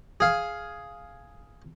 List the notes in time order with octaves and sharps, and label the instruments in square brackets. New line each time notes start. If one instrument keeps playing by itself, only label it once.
[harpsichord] G#4 F5